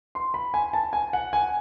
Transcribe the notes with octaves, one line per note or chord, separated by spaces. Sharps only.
C6
B5
G#5
A5
G#5
F#5
G#5